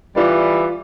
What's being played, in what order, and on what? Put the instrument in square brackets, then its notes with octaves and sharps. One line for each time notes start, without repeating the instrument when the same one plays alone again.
[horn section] E3 G3 [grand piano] F4 B4 D5